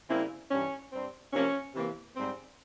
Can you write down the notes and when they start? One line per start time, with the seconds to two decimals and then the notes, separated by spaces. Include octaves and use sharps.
0.09 C#3 G3 A#3 C4 E4
0.51 G2 E3 G3 C#4
0.92 G2 G3 C4
1.33 C3 F3 A#3 C#4
1.74 C3 E3 A#3
2.16 G#2 G3 C4